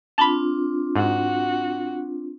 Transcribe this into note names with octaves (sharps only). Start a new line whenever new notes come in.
C4 D4 F4 A5 B5
G#2 F#4